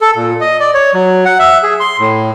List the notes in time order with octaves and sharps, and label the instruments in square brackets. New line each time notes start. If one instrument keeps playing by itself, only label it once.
[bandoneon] A4
A#2
D#5
D5
C#5
F#3
F#5
E5
G#4
C6
A2